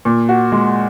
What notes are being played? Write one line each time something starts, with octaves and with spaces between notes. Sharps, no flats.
A#2
F#4
G#3